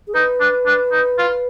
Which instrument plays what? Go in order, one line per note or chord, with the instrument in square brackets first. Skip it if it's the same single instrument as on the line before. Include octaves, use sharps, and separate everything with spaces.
[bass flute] G#4
[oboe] D#4 [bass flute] B4
[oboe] D4
D4
D#4
F4